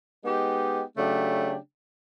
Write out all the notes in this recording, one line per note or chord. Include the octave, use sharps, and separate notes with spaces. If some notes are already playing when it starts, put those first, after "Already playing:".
G#3 B3 D#4 G4
C#3 F#3 A3 D4 G4